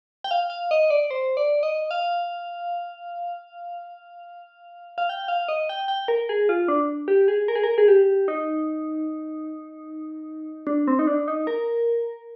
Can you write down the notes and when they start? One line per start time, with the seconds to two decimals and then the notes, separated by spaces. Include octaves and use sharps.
0.24 G5
0.31 F5
0.50 F5
0.71 D#5
0.90 D5
1.11 C5
1.37 D5
1.63 D#5
1.91 F5
4.98 F5
5.09 G5
5.28 F5
5.49 D#5
5.69 G5
5.88 G5
6.08 A#4
6.29 G#4
6.49 F4
6.68 D4
7.08 G4
7.28 G#4
7.48 A#4
7.55 G#4
7.63 A#4
7.78 G#4
7.88 G4
8.28 D#4
10.67 D4
10.88 C4
10.99 D#4
11.07 D4
11.28 D#4
11.47 A#4